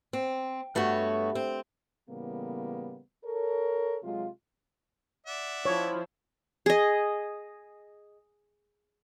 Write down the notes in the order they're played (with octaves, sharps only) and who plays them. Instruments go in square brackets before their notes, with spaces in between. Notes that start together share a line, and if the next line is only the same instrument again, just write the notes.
[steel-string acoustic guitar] C4
G2 A3 B3 F#4 C#5
C4
[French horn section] A2 C#3 E3 G3 A#3 B3
A4 A#4 C#5
C3 F#3 G#3 F4
[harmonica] D5 E5 F#5
[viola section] F3 E4 [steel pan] C#5
[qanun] G#4 D#5